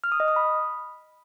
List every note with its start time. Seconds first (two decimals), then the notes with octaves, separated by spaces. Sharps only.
0.04 F6
0.12 D#6
0.20 D#5
0.28 D#6
0.36 B5